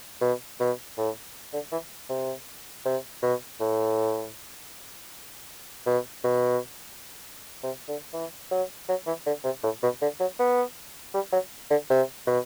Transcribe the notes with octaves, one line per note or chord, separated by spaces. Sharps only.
B2
B2
A2
D3
E3
C3
C3
B2
A2
B2
B2
C3
D3
E3
F#3
F#3
E3
D3
C3
A2
B2
D3
F#3
B3
G3
F#3
D3
C3
B2